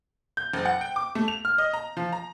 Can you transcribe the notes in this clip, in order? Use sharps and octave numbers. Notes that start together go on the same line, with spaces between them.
G6
F#1
F#5
G5
D6
A3
F7
F6
D#5
A#5
F3
A#5